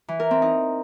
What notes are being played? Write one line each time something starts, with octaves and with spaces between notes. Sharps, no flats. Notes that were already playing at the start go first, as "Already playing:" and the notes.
E3
A#4
C4
D#4